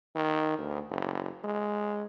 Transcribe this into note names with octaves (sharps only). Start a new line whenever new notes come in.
D#3
D2
F#1
G#3